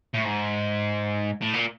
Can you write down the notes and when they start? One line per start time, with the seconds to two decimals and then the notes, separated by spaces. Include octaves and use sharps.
0.14 A2
0.24 G#2
1.42 A2
1.53 A#2